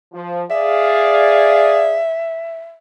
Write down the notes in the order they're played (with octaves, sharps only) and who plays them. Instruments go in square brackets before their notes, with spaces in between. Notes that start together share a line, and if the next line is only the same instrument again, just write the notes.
[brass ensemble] F3
[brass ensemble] G#4 D5 F5 [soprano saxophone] E5